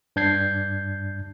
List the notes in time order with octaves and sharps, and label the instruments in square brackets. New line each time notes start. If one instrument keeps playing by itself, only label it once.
[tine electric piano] G2 D4 G6 G#6 C7